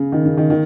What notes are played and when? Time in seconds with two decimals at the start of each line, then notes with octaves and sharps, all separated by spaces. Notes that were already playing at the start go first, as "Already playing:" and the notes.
Already playing: C#3
0.12 D#3
0.25 C#3
0.37 D#3
0.50 D#3